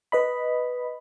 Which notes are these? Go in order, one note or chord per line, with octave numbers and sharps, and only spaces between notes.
B4 D#5 B5